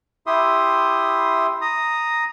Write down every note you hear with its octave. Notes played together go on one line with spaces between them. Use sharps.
E4 G4 E5 C6 D#6
A#5 D#6